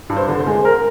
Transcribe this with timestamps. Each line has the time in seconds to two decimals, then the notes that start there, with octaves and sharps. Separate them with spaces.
0.10 G2
0.17 C5
0.28 D3
0.40 C5
0.46 G#3
0.65 A#4